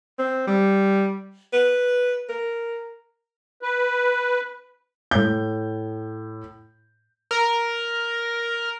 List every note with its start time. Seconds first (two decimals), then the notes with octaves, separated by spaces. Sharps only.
0.19 C4
0.47 G3
1.53 B4
2.29 A#4
3.62 B4
5.11 A2 G6
7.31 A#4